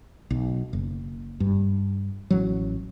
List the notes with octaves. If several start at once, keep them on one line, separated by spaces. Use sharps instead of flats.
B1
F#1
G2
A1 F#3